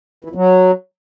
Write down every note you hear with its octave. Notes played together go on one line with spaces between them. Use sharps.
E3
F2
F#3